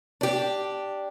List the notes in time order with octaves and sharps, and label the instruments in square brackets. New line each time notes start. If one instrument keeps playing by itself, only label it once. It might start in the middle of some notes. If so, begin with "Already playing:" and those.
[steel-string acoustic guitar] D4 G4